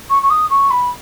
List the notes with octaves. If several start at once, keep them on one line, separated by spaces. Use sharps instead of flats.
C#6
C#6
D#6
C#6
B5